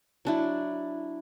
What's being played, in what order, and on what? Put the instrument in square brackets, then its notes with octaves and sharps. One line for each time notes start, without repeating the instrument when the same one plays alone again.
[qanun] F#3 D4 E4